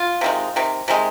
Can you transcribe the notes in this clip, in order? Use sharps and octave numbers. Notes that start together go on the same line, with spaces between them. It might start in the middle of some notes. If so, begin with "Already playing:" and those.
Already playing: F4
C3 D#3 G#3
C3 D#3
C3 D#3 G#3